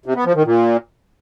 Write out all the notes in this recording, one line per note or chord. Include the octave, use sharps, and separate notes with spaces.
C3
B3
F3
D#3
A#2